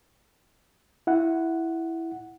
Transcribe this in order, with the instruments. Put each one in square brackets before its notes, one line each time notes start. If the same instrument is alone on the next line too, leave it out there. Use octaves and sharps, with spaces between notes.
[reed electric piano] E4 F#5